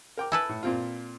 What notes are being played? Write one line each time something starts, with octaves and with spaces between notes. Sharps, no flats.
A#4 G5 D6
E4 A4 B4 G#5
A2
A#2 C4 F4